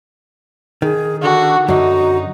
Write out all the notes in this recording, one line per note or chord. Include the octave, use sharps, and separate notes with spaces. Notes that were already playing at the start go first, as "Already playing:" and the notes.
D#3 G#4
D3 F#4
F#2 D3 D#4 F#4